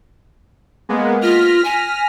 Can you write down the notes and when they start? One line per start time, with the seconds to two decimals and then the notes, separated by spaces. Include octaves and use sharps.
0.89 G#3 A#3 B3
1.22 F4 F6 A#6 B6
1.64 G#5